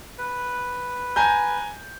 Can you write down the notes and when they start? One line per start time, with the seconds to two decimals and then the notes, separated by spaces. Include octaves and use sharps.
0.18 B4
1.16 G#5 A#5 G6